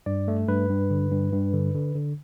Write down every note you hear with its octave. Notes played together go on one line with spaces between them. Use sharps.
G2 D5
A3
G2 B4
G2
D3
G2
G2
D3
D3
D3